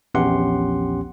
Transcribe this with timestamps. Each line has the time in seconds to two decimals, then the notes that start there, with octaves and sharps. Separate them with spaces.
0.14 A#1 E2 C#4 G4 F#5 C6